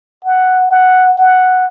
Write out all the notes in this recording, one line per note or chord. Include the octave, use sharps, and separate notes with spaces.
F#5
F#5
F#5